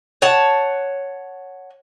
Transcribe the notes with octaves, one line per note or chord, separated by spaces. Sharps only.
C#5 F#5 A5